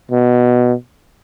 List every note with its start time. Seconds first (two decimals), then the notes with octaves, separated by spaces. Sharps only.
0.11 B2